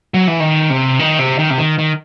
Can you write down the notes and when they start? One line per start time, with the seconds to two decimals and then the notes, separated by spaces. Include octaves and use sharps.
0.14 F#3
0.28 E3
0.40 D#3
0.70 C3
0.99 D#3
1.19 C3
1.39 D#3
1.50 C3
1.58 D#3
1.79 D#3